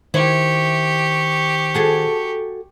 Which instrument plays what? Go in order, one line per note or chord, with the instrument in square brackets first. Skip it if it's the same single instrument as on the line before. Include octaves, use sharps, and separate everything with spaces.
[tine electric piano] D#3 C5 [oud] E4 [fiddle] G4 C#6
[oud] F#4 G#4 A4